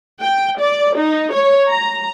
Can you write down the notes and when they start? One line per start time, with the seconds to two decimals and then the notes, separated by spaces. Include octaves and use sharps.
0.21 G5
0.59 D5
0.97 D#4
1.34 C#5
1.70 A#5